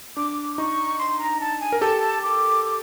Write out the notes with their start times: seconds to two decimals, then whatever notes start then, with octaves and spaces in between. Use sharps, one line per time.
0.17 D4 D6
0.58 D#4 C#6
0.99 C6
1.19 A#5
1.41 A5
1.61 G#5
1.72 A#4
1.81 G4 A4 A5
2.23 D6
2.65 D6